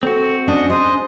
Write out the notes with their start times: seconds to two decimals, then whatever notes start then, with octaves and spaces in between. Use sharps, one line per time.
0.03 C4 F#4 A4
0.48 C#4 D4 D#5
0.70 G#3 C5 D#5